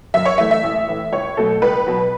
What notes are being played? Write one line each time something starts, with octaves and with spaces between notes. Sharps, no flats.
F#2 E5
C#5
E3 A3 E5
E5
A1
A2 E3
C#2 C#5
B2 F#3 A3 A4
C#2 B4
B2 F#3